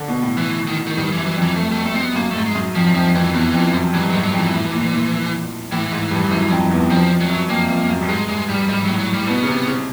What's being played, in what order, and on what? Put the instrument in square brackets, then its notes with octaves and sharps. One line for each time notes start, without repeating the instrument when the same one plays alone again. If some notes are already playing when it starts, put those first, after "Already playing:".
Already playing: [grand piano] D3
B2
A2
[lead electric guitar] E3
D#3
D#3
[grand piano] G2 [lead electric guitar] D#3
[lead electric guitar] E3
[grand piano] F#2
[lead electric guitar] E3
[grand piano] F2
[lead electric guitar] E3
A3
A3
A3
C4
B3
[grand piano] F#2 [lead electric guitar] A#3
[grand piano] G#2 [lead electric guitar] A3
[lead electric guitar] G#3
[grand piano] F#2
[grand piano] F2 [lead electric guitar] F3
[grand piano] F2 [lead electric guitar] F3
[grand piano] F2 [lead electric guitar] E3
[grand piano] E2 [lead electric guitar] E3
[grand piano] F2
F#2
[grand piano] G2 [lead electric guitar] E3
[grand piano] G#2 [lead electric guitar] F#3
[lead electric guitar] F#3
[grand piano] F2
[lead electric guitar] E3
[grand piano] A2
A#2
A#2
[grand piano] A2 [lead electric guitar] E3
[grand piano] G#2
G2
F#2
F2
E2
[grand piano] F2 [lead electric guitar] F3
[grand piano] F2
[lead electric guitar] F#3
[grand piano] F#2
[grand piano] F2 [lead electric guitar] A#3
[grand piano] F2
F#2
G2
[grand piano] G#2 [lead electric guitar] G#3
[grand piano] G2 [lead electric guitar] G#3
[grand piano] G2 [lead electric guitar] G3
[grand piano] G#2 [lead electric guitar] G3
[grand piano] A2 [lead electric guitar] F#3
[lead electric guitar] F#3
G3
[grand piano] B2 [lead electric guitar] B3
[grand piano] C#3
C3
C#3